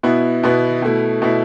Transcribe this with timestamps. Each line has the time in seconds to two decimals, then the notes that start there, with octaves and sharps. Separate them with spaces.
0.03 B2 B3 E4
0.43 B2 B3 E4
0.82 B2 A3 E4
1.22 B2 A3 E4